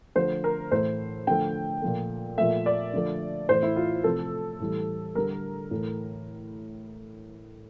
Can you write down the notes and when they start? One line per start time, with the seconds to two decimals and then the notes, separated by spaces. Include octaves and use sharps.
0.15 D3 F3 A3 C5
0.44 A#4
0.72 A2 E3 A3 C5
1.27 D3 F3 A3 G5
1.82 A#2 F3 A3
2.37 A#2 F3 A3 E5
2.66 D5
2.93 D3 F3 A3
3.49 A2 E3 A3 C5
3.63 E4
3.76 F4
4.04 C3 F3 A3 A4
4.60 A2 E3 G3
5.15 D3 G3 A#4
5.71 A2 E3 A3